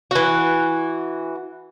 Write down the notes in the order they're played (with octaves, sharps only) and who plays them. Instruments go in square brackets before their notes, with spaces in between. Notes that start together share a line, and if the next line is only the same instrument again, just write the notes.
[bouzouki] E3 F#4